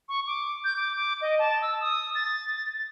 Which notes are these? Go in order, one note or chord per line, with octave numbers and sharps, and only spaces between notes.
C#6
D6
G6
D6
D6
D#5
A5
E6
D#6
A6